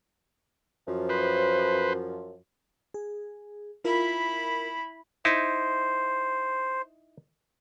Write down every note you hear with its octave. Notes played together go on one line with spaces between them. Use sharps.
F#2 F3
B4 C5
G#4
E4 F4 A#4 B5
D#4 E4 C5